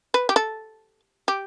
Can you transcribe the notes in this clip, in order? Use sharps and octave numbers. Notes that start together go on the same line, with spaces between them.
B4
G4
A4
G4